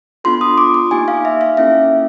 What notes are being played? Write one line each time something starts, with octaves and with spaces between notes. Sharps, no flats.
B3 D4 F4 A4 C6
D#6
D6
D6
A#3 D#4 G4 G#5
F5
E5
F5
A#3 C#4 E4 A4 E5